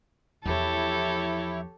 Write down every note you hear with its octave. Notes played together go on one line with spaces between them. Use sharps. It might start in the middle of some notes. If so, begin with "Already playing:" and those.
E2 F3 E4 G4 A4 C#5